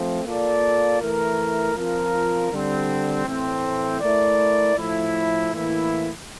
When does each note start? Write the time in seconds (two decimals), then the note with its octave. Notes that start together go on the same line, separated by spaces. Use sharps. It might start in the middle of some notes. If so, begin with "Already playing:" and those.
Already playing: F3 A3 C4
0.25 A#3 F4 A4 D5
1.01 E3 A3 E4 A#4
1.75 F3 C4 F4 A#4
2.51 D3 G3 C4
3.26 A2 E3 A3 C4
4.01 A3 E4 A#4 D5
4.76 A2 F3 A3 E4
5.51 A2 E3 A#3 E4